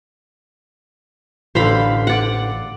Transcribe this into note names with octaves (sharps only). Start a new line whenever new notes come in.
A1 D3 C5 F5 B5
D5 F#5